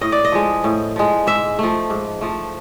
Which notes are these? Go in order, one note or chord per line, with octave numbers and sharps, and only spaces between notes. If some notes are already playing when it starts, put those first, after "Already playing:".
A2 D#5
D5
D#5
F3 G#3
A2
F3 G#3
G#2 E5
F3 A3
G#2
F3 A3